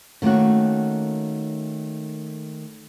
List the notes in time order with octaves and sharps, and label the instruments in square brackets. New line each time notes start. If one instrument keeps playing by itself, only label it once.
[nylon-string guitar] D#3 A3 A#3 C#4 F#4